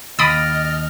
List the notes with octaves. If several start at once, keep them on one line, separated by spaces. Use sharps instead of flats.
D#2 D#5 B5 D#6 F6 A6 A#6 D7